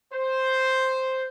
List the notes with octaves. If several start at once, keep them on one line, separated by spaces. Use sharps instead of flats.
C5